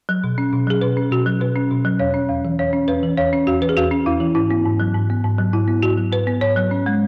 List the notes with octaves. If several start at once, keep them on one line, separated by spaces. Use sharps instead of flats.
F#3
B2
C#4
B2
F#3 G#4
B2 B4
C#4
B2 F#4
F#3
B2 B4
C#4
B2
F#3
E2 C#5
C#4
E2
E3
E2 C#5
C#4
E2 B4
E3
E2 C#5
C#4
E2 F#4
E3 B4
G#4
E2 F#4
C#4
E2 E4
E3
G#2 E4
B3
G#2
F#3
G#2
B3
G#2
F#3
G#2 E4
B3
G#2 F#4
F#3
G#2 B4
B3
G#2 C#5
F#3
C#4
G#3